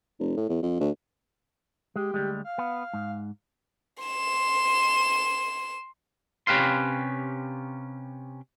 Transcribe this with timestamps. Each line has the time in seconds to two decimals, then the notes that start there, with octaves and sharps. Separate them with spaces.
0.19 F1
0.37 A2
0.49 E2
0.63 F2
0.80 D2
1.96 G#3 G4
2.14 D2 G3 G#3
2.44 F5
2.58 B3
2.93 G#2
4.03 C6 E7
6.47 C3 C#4 G4 B4 F5 C6